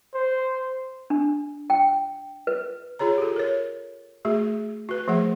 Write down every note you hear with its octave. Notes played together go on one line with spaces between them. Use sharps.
C5
D4
G5
B4
F4 G#4 C#5 A#5
G4 A4
A#4 C#5
A3 F#4 G#4
F#4 B4
F3 A3 G#4 F#5